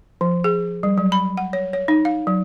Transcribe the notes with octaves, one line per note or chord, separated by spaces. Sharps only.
F3
G#4
G3
F#3
B5
F#5
C#5
C#5
D#4
F5
F#3